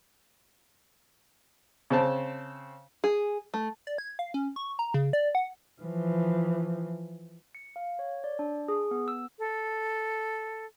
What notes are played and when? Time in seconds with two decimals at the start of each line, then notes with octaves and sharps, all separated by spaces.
1.90 C#3 C4 A5
3.04 G#4
3.54 A3
3.87 D5
3.98 G#6
4.19 F5
4.34 C#4
4.56 C#6
4.79 A#5
4.94 C#3
5.13 D5
5.35 F#5
5.82 E3 F3
7.55 C#7
7.76 F5
7.99 C#5
8.24 D5
8.39 D4
8.68 G#4
8.91 B3
9.08 E6
9.39 A4